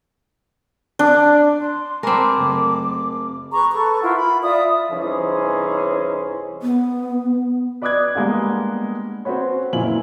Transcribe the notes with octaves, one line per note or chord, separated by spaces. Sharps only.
D4
C6
C4 A#4 G#5 A5 B5 D6
F#1 A3
G#4 B4 A#5 C#6
A4 B4 C#6
E4 F4 A#4 F#5
B5
F4 D5 E5 D#6
C2 E3 C#4 D#4 G#4 C5
B3
B4 D5 D6 D#6 F#6 G#6
G3 G#3 A#3 B3 D4
C4 C#4 F#4 B4 C#5
F#1 A#2 E4 G#5 F#7